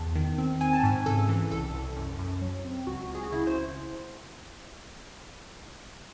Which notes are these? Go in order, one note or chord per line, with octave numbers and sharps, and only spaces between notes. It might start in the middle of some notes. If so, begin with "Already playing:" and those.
Already playing: E2 A5
D#3
C4
C4 G#5
A5
G#2 G#5
C#3 A4
E3
C2 A4
C2
F#2
F#2
F#3
C4
C#2 F#4
C#2
G#4
F#4
C#3 E4
C5